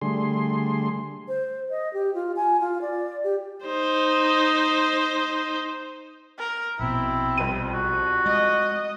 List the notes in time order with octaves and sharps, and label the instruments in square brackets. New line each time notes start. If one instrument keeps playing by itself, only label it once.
[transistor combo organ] D3 G3 A3 G#4 C6
[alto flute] C5
D#5
G4
F4
G#5
F4
D5
G4
[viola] D#4 C5
[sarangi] A#4
[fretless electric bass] A#1 B2 [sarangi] C4 [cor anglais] E4
[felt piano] C2 F2 D#7
[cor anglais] F#4
[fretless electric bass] G#3 [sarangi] D#5